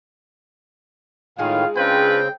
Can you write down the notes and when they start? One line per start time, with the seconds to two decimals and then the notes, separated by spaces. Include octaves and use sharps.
1.38 A2 D#3 G#3 D#4 F4 G#4 F5
1.76 C#3 C4 D4 F4 B4 G5